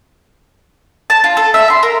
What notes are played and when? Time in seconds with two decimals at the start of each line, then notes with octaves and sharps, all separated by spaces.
1.10 A5
1.24 F4
1.37 A4
1.54 E5
1.70 C6
1.83 A#4